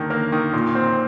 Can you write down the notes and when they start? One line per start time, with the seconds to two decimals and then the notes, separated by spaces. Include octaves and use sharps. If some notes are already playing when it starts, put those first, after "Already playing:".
Already playing: D3 D#3 A#3 A#4
0.10 A#3 A#4
0.32 D#3
0.53 A#2
0.75 C4